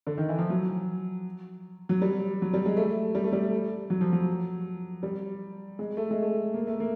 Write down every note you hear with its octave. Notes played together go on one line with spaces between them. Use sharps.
D3
D#3
E3
F3
F#3
F#3
G3
F#3
G3
G#3
A3
G3
A3
G3
F#3
F3
F#3
G3
G#3
A3
G#3
A3
A#3
A3
A#3